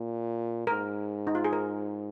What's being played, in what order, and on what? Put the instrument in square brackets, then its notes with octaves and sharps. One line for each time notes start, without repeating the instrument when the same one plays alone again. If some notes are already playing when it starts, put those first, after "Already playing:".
Already playing: [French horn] A#2
[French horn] G#2 [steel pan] A#4
[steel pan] D#4
F4
G#4
A#4